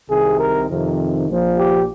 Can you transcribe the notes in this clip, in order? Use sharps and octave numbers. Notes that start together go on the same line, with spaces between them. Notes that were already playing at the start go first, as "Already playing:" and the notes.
C2 C3 D#3 G#4
A#4
F2 C3 D#3
A#1 A#2 F3
G4